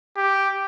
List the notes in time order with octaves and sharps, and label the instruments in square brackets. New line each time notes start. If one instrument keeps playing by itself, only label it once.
[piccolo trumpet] G4